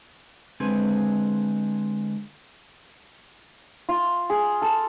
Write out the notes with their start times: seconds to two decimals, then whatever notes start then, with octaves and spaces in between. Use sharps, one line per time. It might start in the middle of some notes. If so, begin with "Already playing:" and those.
0.60 D3 G#3 C4 G#4 B4 G#5
3.89 F4
4.30 G#4
4.62 A4